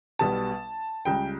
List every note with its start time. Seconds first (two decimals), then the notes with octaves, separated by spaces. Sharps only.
0.19 B1 B2 G3 B3 A5
1.05 C#2 C#3 G3 G5